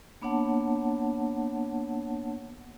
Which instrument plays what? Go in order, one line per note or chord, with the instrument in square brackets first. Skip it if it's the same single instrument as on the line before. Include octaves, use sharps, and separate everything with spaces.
[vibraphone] A#3 B3 D4 C#5 F#5 A5